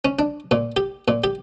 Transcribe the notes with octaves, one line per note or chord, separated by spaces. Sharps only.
C#4
D4
A#2
G4
A#2
G4